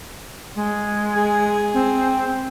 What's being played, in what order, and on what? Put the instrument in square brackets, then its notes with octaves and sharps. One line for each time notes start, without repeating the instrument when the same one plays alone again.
[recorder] G#3
[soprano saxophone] G#4
[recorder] C4